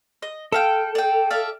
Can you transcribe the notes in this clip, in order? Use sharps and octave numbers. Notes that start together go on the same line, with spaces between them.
D#5
A4 E5 F5 G5
D5 G5
D5 E5 F5